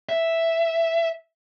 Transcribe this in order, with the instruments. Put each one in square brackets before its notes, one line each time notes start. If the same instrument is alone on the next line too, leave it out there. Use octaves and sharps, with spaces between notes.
[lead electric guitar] E5